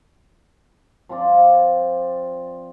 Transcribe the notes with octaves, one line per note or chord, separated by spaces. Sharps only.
F3 C4 F4 D5